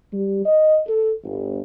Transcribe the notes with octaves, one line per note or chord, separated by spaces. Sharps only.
G3
D#5
A4
G1